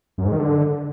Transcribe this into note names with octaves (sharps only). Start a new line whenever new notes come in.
F#2
G#2
D#3
D3